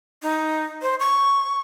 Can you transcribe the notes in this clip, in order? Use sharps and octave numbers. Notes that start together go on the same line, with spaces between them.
D#4
C5
C#6